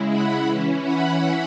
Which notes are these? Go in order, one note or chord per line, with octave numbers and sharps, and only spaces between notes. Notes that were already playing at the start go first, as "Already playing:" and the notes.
Already playing: C#3 G#3 E4
F#5 B5
E3 C#4 E4
F#5 B5